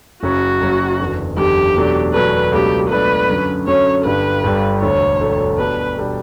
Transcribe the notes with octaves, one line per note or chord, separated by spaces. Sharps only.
F#1 F#2 C#3 F#3 C#4 F#4
F#1 F#2 C#3 F#3 C#4
F#1 E2 D3
F#1 E2 D3 G4
E2 B2 F#3 A3 D4
E2 B2 F#3 A3 D4 B4
C#2 B2 F#3 A3 D4 G4
C#2 B2 F#3 A3 D4 B4
F#2 D3 F#3 C#4
F#2 D3 F#3 C#4 C#5
G1 G2 D3 G3 B4
G1 G2 D3 G3
E1 D2 D3 A3 C#5
E1 D2 D3 A3
B2 G3 D4 A4 B4
B2 G3 D4 A4